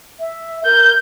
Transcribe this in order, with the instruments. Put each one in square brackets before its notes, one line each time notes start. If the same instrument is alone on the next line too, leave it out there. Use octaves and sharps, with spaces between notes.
[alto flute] E5
[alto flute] A#4 [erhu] G6